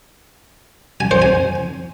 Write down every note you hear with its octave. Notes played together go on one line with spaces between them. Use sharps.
G#5
C5
G#5